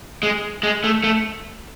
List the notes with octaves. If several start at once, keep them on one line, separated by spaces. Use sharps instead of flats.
G#3
G#3
A3
A3